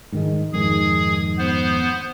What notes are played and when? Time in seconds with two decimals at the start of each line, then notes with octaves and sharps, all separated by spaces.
0.12 G#2 D#3 G#3
0.53 F2 G#2 D#3 G#4
1.39 B3 C5